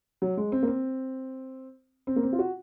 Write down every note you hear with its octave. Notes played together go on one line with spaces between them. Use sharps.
F#3
G#3
C4
A#3
C4
C4
A#3
C4
F4
F#4